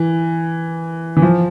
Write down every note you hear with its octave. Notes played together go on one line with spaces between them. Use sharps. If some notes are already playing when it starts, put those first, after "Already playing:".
Already playing: E3
E3
F3